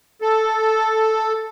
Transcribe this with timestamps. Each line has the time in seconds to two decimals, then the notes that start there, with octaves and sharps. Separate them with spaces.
0.22 A4